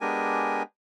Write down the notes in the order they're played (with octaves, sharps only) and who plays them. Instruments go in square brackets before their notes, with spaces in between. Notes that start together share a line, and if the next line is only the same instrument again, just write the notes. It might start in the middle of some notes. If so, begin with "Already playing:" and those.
[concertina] G#3 B3 D4 G4 A#4 G#5